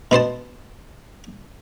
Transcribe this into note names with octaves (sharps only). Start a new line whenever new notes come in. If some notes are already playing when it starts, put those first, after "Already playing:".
B2 B3 C5 A5